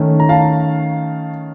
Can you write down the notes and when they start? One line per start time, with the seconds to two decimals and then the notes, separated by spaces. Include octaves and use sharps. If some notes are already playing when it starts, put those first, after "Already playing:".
Already playing: D#3 A3 C#4
0.20 A#5
0.29 F5 A5